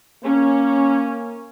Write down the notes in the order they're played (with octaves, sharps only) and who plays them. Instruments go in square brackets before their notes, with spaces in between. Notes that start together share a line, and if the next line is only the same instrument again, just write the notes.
[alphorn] A#3 [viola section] C#4